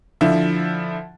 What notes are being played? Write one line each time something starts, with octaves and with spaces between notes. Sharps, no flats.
D3 F3 E4